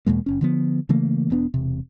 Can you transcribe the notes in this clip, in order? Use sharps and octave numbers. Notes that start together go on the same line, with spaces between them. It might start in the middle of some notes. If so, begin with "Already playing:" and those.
E2 B2 G#3 A#3
F#1 C#4
D3 F3 B3
C#3 E3 A3 A#3
E1 B3 D4
E1 C3